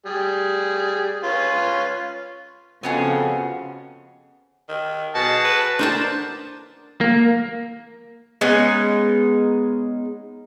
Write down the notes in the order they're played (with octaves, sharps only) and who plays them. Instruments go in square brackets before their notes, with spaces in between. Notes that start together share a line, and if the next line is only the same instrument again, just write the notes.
[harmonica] G3 G#4
C#4 F4 B4
[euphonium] F2 [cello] C#3 [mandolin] B3 F#4 G#4
[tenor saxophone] D#3
[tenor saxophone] B2 [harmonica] F#4 G#4 A5
[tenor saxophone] B4
[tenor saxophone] B3 [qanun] D4 A#4 A5 [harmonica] C5
[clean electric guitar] A#3
[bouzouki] G#3 B3 C#4 D#4